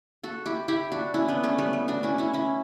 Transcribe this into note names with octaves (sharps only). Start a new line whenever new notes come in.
F#4 A4
E4 G4
E4 G4
D4 F#4
C#4 E4
B3 D4
A3 C#4
G3 B3
A3
D4 F#4
C#4 E4
C#4 E4
C#4 E4